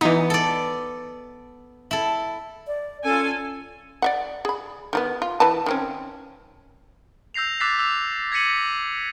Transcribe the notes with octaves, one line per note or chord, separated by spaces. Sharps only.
E3 B3 D#4
A4 D5
E4 A4
D5
C#4 F4 A4 G#5
D5 E5 F#5
G#4 B5
D#3 F#3 B3
F4
E3 B4 A5
D#3 C4 C#4
E6 G6 A#6 C7 F7
D6 E6 F#6 A6 B6 C7
E6 F7
G#6 A#6 B6 C#7 D#7 F#7